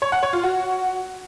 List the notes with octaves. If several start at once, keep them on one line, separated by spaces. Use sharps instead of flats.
C#5
F#5
C#5
F4
F#4